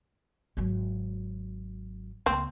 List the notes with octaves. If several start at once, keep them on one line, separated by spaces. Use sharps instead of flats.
G#1 F#3
C#2 A#3 C4